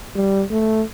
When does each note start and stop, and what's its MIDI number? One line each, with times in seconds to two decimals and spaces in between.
0.16 0.43 55
0.51 0.83 57